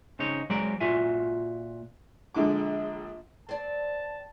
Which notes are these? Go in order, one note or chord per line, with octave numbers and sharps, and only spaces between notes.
C#3 C4 D#4 C#5
F#3 G#3 C4 A#4 D5
A#2 F4 F#4 E5 G#5
A#1 D3 G#3 D6
C4 D5 A5